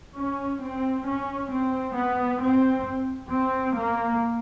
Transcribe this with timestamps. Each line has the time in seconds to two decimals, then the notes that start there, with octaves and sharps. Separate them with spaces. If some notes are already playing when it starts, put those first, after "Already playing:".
0.16 C#4
0.61 C4
1.07 C#4
1.51 C4
1.96 B3
2.41 C4
3.31 C4
3.76 A#3